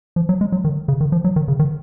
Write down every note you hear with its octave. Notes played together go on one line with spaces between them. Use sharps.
F3
F#3
G#3
F#3
D#3
C#3
D#3
F3
F#3
D#3
C#3
D#3